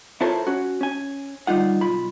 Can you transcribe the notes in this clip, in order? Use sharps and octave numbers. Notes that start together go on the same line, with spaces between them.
E4 F4 A4 A#4 C5 C#5
C#4 F#4
C#4 G#5
D2 G3 D#4 F4 F#5
B1 F4 B5